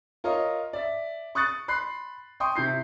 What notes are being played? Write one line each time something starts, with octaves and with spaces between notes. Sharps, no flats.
F4 A#4 C#5 D#5
D5 E5
C#6 D#6 F#6 A6 C#7
B5 C6 F#6 C7
G5 C6 C#6 D#6
C3 E4 G6 C7